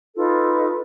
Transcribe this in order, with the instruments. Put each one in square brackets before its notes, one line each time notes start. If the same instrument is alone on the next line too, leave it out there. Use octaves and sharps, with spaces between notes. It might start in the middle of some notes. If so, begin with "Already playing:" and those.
[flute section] D#4 F4 A4 B4